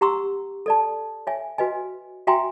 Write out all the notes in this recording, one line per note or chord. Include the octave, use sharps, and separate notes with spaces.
G4 F#5 A#5 C6 C#6 E6
A4 D5 A5
C#5 E5 G#5
F#4 B4 D#5 G#5
F#4 E5 G5 G#5 A#5 C6